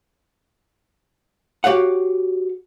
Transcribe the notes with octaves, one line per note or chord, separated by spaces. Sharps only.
F#4 G4 C#5 F5 F#5